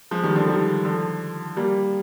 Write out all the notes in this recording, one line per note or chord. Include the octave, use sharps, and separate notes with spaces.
F3 G#3
D#3 G3
D3 F3
D#3 G3
D3 F3
G3 A#3